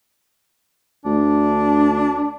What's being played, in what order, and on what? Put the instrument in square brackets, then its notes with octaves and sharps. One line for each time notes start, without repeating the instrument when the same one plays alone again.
[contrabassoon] D2 [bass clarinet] D4